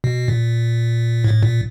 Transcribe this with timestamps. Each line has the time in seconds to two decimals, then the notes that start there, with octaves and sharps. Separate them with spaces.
0.04 B2
0.28 A#2
1.24 A2
1.43 A#2